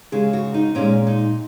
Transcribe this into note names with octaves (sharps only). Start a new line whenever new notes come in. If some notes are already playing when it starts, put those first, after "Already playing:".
C#3 G#3 G#4
F#4
D#4
A#2 G#3 C#4
D#4